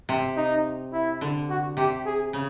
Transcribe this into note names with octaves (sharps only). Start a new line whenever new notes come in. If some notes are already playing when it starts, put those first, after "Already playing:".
C3
D#4
E4
D3
F#4
C3 G4
G#4
C#3